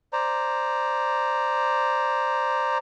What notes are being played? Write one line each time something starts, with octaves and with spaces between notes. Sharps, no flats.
C5 D5 A#5